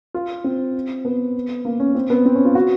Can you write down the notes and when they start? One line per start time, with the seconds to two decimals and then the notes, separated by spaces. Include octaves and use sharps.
0.14 F4
0.44 C4
1.05 B3
1.65 A#3
1.80 C#4
1.95 C4
2.10 B3
2.26 C4
2.35 C#4
2.45 F4
2.55 F#4